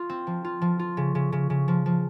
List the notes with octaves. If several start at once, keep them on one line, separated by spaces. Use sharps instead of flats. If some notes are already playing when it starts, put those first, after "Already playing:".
Already playing: F4
C4
F3
F4
F3
F4
C#3
C#3
C#3
C#3
F3
F3